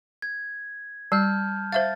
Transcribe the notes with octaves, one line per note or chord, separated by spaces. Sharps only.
G#6
G3 A5 F6 G6
C5 E5 F5 A6